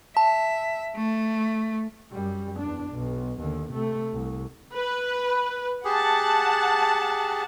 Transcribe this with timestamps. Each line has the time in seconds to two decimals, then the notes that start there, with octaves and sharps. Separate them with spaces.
0.17 E5 A5
0.96 A3
2.12 F#2 G3
2.59 E2 D4
2.90 B1
3.40 D#2 D3
3.72 C3 A3
4.12 C2
4.74 B4
5.85 G4 G#4 F#5 A5